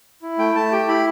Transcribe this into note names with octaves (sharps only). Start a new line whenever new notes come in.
E4
A3 G5
A3 A5
G4 G5
E4 B5